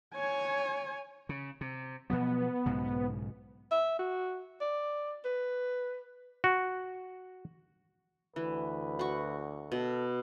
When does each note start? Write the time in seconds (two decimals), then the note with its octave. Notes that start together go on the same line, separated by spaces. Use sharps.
0.14 C#5 G#5
1.29 C#3
1.61 C3
2.10 B2 F3 F#3 B3
2.66 B1 G#2 C#3
3.71 E5
3.99 F#4
4.61 D5
5.25 B4
6.44 F#4
8.36 D2 E3 B4
8.99 F#4 C#6
9.72 B2 A4